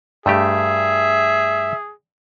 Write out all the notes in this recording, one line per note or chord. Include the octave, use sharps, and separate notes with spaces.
G2 A3 G4 G#4 E5